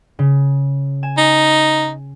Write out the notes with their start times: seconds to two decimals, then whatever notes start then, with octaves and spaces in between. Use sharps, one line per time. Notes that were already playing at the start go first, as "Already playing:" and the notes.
0.19 C#3
1.03 G#5 E7
1.18 D#4